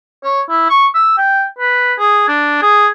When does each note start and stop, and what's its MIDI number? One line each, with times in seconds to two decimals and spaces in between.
0.24 0.41 73
0.50 0.66 64
0.69 0.86 85
0.95 1.13 88
1.17 1.46 79
1.59 1.94 71
1.99 2.25 68
2.28 2.59 62
2.62 2.87 68